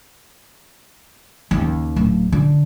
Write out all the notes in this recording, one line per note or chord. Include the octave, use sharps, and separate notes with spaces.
D#2 C#3
D1
D3